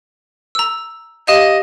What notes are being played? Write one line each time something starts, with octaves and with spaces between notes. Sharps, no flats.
A#5 E6
G4 D#5 F5